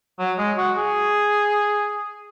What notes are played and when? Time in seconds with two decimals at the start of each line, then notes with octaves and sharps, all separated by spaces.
0.19 F#3
0.38 G#3
0.58 F#4
0.77 G#4